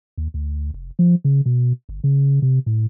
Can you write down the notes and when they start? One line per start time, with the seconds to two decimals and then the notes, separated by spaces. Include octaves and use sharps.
0.18 D#2
0.34 D2
0.74 F1
0.99 F3
1.24 C#3
1.46 B2
1.89 G1
2.04 C#3
2.42 C3
2.66 A2